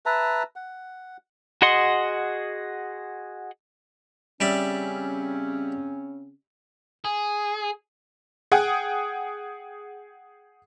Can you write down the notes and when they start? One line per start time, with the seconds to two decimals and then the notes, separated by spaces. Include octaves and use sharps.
0.06 B4 E5 A5 A#5
0.56 F#5
1.62 F#4 G#4 D#5 F#5 C6
4.41 C#3 G3 C4 C#4 D5 E5
7.05 G#4
8.52 G#4 F#5 G5 D#6